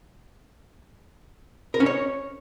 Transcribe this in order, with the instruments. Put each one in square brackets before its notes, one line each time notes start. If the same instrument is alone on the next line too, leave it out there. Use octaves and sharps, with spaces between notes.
[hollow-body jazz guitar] A#4
C#4
C#5